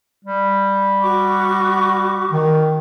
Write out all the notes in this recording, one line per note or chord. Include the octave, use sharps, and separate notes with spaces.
G3
F#4 C#6 D6
D#3